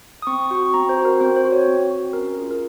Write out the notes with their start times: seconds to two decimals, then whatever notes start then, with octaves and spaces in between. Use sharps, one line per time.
0.22 D#6
0.27 C4 C#6
0.51 F#4 C#6
0.74 C4 A#5
0.89 C5
0.98 F#4
1.05 A#4
1.20 C4 C5
1.36 C5
1.45 F#4
1.52 C#5
1.68 C4
1.90 F#4
2.13 C#4 A#4
2.37 F4 G#4
2.51 A#4